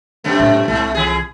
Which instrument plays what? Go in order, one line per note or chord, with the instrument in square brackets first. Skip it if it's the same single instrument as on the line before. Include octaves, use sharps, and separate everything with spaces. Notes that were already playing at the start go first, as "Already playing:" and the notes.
[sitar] F#2 C3 A3
[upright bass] A2
[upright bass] C2 [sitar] G#2 A3
[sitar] E3 G#4